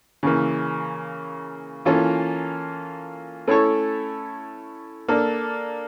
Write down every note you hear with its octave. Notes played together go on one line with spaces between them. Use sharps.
C#3 E3 A#3
E3 A#3 C#4 F4 A4
A3 C#4 E4 A4 C#5
A#3 D4 A4